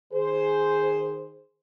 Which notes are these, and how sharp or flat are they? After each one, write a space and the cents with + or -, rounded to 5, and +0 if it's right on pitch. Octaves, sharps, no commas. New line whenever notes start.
D#3 -20 G#4 +0 C5 +0